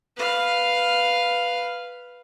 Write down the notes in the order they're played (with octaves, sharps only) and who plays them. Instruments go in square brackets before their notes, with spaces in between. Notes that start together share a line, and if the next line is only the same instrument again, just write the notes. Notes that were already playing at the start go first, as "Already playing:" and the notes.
[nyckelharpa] B4 F5